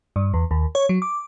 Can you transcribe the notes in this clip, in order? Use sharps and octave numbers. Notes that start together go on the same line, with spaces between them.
G2
E2
D#2
C#5
F#3
D6